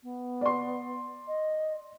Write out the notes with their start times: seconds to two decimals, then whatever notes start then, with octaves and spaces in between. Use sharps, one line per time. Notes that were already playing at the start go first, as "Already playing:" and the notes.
0.03 B3
0.41 D5 C6
1.27 D#5